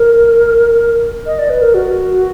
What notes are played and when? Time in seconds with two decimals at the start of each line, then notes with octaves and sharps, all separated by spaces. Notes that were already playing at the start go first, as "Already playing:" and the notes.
Already playing: A#4
1.26 D#5
1.39 D5
1.50 B4
1.61 A#4
1.74 F#4